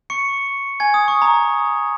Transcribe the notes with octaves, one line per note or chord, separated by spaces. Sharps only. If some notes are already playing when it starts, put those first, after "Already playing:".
C#6 C#7
G#5 G#6
D#6
C#6
A#5